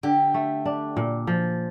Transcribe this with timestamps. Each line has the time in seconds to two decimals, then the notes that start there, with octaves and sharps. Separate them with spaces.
0.03 D3 G4
0.34 A3
0.65 D4
0.97 A#2
1.27 F3